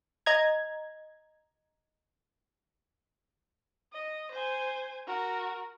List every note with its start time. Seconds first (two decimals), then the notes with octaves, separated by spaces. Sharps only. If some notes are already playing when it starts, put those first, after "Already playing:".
0.26 D#5 A#5 G#6
3.93 D#5
4.31 C5 G#5
5.07 F#4 A#4